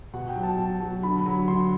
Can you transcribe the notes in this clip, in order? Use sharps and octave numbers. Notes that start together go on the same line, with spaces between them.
B2 F#5
G5
F#3
A5
B2 A5
F#3
D3 B5
F#3
D3 C6